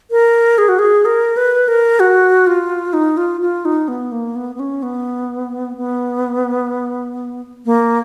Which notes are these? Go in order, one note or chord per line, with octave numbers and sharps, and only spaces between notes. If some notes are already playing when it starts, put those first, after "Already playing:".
A#4
G#4
F#4
G#4
A#4
B4
A#4
F#4
F4
D#4
F4
F4
D#4
B3
A#3
B3
B3
C#4
B3
B3
A#3